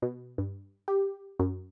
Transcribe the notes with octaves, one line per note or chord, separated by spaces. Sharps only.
B2
G2
G4
F#2